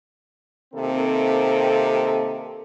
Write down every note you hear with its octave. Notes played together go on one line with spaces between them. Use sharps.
C3 D#3 A#3 C4 A4